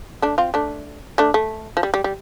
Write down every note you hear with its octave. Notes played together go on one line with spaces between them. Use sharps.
A3 D4
C4 F4
A3 D4
A3 D4
A3
F3
G3
G3
G3